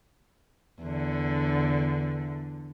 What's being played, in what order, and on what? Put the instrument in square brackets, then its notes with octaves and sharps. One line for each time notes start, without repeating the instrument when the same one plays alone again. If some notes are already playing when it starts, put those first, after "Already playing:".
[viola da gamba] E2 D3